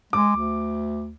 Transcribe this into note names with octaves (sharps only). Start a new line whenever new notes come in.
G#3 D6
D2